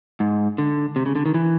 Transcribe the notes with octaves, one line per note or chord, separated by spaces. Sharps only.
G#2
D3
C3
C#3
D3
D#3
E3